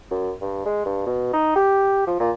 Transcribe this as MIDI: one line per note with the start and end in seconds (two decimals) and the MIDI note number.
0.11 0.32 42
0.41 0.63 43
0.66 0.84 56
0.86 1.06 43
1.06 1.32 47
1.34 1.52 63
1.56 2.04 67
2.07 2.17 53
2.20 2.31 46